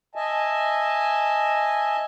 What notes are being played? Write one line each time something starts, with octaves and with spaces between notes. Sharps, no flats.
D#5 E5 G#5 A5